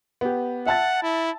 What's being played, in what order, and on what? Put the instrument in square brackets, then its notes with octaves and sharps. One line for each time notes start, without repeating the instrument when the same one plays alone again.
[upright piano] B3 G4
[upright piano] E5 A5 A6 [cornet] F#5
[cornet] E4